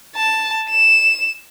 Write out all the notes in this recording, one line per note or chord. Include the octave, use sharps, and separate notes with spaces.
A5
E7